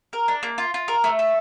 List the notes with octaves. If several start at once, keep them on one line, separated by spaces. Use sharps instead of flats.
A#4
D4
A#3
F4
F4
A#4
A3
A4